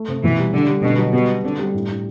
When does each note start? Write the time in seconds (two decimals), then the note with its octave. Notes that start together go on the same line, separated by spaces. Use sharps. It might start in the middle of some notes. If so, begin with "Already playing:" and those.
Already playing: A3
0.08 C3
0.23 B2 E3
0.38 G3
0.53 D3 G4
0.68 G3
0.83 B2 D3
0.98 F#3
1.13 B2 G3
1.29 B3
1.44 D3 C4
1.59 G3
1.74 A2
1.88 A2